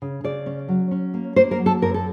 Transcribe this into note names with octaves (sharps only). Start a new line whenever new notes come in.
C#3
C#3 D5
C#4
F#3
C#4
A#3
A#3 C5
A#4
F#3
A4
F#2 A#4
A4